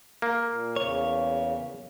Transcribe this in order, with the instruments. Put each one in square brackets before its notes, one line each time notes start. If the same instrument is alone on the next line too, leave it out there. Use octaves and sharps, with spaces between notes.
[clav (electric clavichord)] A#3
[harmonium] A#2
[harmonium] E2 C#3 [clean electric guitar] C#5